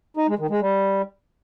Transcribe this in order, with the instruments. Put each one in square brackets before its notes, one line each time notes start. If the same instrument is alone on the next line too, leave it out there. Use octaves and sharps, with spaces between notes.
[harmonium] D#4
G#3
D#3
G#3
G3